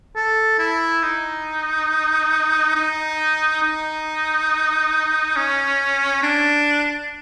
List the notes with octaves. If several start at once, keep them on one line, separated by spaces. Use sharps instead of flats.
A4
E4
D#4
D#4
D#4
C#4
D4